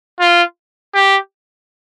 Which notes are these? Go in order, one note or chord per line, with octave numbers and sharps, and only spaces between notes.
F4
G4